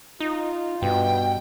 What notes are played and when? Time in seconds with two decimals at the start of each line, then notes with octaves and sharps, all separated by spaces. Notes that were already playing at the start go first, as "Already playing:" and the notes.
0.20 D#4 F4
0.82 G2 B2 G5